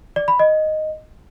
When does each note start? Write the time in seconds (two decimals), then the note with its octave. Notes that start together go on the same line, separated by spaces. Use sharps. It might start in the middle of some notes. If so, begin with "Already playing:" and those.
0.16 D5
0.28 B5
0.39 D#5